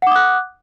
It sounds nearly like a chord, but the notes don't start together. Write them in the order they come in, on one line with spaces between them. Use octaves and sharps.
F#5 D6 D#6 F#6